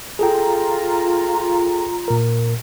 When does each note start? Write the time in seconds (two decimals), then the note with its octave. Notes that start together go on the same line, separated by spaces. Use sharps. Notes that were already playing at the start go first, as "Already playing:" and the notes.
0.19 F4 G#4 A4 G5 A#5
2.08 A#2 A#4